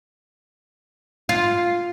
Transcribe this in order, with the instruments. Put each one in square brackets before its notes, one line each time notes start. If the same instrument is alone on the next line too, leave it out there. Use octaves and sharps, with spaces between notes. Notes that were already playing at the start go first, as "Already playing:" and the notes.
[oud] F4